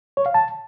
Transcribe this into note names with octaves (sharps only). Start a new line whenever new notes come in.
C#5
F5
A5